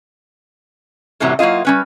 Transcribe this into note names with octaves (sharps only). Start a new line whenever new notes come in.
F#2 A2 C3 E3 F#3 G3
F#3 A#3 E4 F4 D#5
G3 C#4 B4